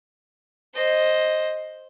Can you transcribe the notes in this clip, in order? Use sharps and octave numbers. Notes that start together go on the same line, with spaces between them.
C5 D#5